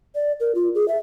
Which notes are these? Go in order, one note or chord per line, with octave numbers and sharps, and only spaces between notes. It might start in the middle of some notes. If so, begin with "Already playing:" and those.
D5
A#4
F4
G#4
E5